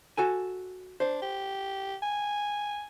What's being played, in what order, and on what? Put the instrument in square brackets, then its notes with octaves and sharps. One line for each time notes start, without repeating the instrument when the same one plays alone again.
[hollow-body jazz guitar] F#4 A4 G#5
[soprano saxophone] D4 [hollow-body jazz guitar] C5
[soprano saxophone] G4
G#5